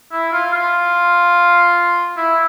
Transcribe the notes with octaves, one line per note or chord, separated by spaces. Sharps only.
E4
F4
F4
E4